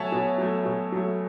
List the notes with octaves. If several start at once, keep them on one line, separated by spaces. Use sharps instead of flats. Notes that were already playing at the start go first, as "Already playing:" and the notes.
Already playing: B2 F#3 A3 C#5 E5 F#5 G#5 A5
B2
F#3 A3
B2
F#3 A3